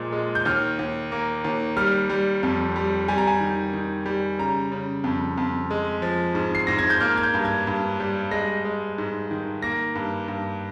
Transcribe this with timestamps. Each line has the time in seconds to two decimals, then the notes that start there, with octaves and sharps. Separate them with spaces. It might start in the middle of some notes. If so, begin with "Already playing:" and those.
Already playing: A#2 F3 G#3
0.12 G#3
0.35 G6
0.45 D#2 F6
0.79 D#2
1.12 A#3
1.44 D#2
1.77 G3 F6
2.10 G3
2.43 F2
2.76 G3
3.08 G3 G#5
3.18 A#5
3.27 G#5
3.40 D#3
3.73 D#3
4.06 G3
4.38 C#3 A#5
4.72 C#3
5.04 F2
5.38 F2
5.71 G#3
6.02 F3
6.35 G#2
6.55 C7
6.67 G#2 A#6
6.79 G#6
6.90 G6
7.00 A#3 F6
7.17 G#6
7.23 G6
7.34 G2
7.45 G#6
7.67 G2
8.00 G3
8.31 G#3 A#6
8.65 G#3
8.98 G#2
9.31 D#3
9.62 A#3 A#6
9.95 G2
10.28 G2